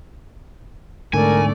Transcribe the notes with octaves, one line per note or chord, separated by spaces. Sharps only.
G#2 D3 A3 A#4 D5 G#5